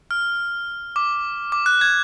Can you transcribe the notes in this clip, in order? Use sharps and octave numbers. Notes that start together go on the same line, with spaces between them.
F6
D6
D6
F#6
G#6